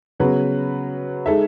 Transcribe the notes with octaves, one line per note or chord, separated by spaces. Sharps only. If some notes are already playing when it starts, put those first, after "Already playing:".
C#3 F#3 B3 F#4 B4
G#3 D#4 A4 E5